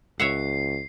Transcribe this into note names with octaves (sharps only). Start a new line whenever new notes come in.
C#2 C#5 E5 F#5 C7